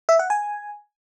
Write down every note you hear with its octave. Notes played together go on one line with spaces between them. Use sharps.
E5
F#5
G#5